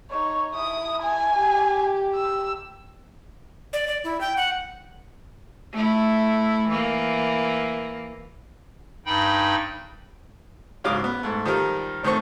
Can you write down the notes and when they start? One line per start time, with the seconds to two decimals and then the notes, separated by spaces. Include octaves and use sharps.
0.11 D#4 C#5
0.55 E4 D#6
1.02 G#5
1.35 G4
2.15 E6
3.73 D5
3.88 D5
4.04 E4
4.21 G5
4.37 F#5
5.72 A3 E4
6.68 E3 A#3
9.06 G2 D#4 G5 B5
10.84 G#2 C#3 F#3 F5 D6 D#6
11.04 B3
11.23 G#2 A3
11.45 D#3 F3 G3 A#4
12.03 A2 D#3 A3 C4 C#6